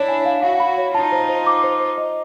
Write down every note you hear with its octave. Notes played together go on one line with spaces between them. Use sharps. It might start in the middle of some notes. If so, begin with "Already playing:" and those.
Already playing: D4 E4 C#5
G#5
F5
E4 F#4 F5
B5
C#5
D#4 F4 A5
C5
C5
D6
C5
C5
D#5